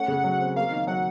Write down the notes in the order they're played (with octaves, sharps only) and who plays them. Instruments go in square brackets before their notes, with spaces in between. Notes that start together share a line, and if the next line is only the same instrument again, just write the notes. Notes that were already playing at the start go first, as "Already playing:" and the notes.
Already playing: [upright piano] A3 C#4 [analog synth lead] F#5
[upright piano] C#3
F#3
C4
[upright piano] A#3 [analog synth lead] F5
[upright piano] D#3
[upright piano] F#3 [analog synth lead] F#5